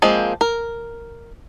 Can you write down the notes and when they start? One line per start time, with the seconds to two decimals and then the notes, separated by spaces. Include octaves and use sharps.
0.02 F3 G#3 A#3 C4
0.41 A#4